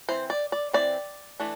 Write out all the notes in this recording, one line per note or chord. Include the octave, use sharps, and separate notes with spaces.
E3 C4 C5
D5
D5
E3 C4 D5
E3 A3 D4